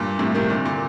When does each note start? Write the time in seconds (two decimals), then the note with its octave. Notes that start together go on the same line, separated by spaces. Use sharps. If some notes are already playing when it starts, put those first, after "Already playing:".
Already playing: G2 A#2
0.19 A2 C3
0.35 C3 D#3
0.50 A#2 D3
0.66 A#2